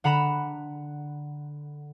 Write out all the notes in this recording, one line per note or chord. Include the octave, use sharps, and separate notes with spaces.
D3 F#5 A#5 B5 B6 E7